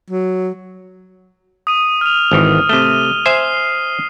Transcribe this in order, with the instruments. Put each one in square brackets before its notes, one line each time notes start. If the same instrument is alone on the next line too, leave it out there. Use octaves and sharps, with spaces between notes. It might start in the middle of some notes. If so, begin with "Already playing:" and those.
[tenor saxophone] F#3
[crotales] D#6 D#7
F6 F7
[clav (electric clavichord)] G#1 D#3 E3
[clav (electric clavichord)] C3 A3 [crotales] D#7 G7
[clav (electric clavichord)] C5 E5 G#5 [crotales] C7